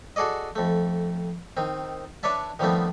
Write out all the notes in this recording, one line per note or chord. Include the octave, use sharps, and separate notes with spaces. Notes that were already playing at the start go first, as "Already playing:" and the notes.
F#4 G#4 A4 D5 D#5
F2 A3
D#3 C4
D4 B4 C#5 D5 E5 A5
D#3 F3 G3 A3 B3 C4